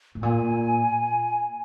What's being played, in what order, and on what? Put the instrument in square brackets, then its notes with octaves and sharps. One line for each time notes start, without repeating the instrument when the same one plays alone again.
[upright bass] A2
[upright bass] A#2 [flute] G#5